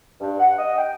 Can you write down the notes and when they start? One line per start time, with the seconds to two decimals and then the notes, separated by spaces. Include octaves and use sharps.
0.21 G2
0.39 F#5
0.57 D#5
0.77 G5